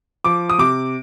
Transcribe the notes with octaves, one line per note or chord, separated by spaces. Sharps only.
F3 D6
D#6
C3 D6